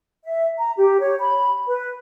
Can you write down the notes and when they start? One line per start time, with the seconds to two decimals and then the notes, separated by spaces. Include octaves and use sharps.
0.25 E5
0.58 A#5
0.78 G4
1.01 C#5
1.18 B5
1.68 B4